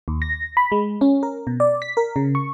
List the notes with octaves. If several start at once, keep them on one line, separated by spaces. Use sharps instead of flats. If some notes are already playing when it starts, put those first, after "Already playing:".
D#2
A#6
B5
G#3
C#4
A#4
B2
D5
B6
A#4
C#3
C#6